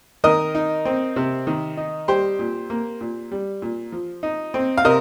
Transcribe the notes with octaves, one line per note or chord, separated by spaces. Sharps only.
D#3 A#4 D#5
D#4
C4
C3
D#3
D#4
G3 G4 C5
A#2
A#3
A#2
G3
A#2
F3
D#4
C4
F5
C3 A#4 D#5